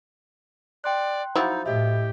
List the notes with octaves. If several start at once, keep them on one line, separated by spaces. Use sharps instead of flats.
D5 G5 C6 F#6
F3 F#3 D#4 E4
A2 G4 D#5 E5